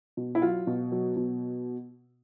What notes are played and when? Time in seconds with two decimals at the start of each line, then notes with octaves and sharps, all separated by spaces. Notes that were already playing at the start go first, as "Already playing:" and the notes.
0.17 B2
0.35 E4
0.42 F#3 F4
0.67 B2
0.92 F#3
1.16 B2